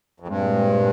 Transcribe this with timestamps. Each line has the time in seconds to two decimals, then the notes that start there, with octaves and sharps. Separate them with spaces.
0.20 F2
0.27 G2 A#2 G#3 C4